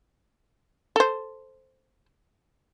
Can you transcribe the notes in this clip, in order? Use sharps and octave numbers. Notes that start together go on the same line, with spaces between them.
A4 C5